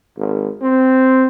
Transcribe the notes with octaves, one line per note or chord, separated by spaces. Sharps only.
G#1
C4